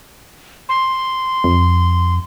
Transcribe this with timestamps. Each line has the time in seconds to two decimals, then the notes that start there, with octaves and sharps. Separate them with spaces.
0.69 C6
1.44 F2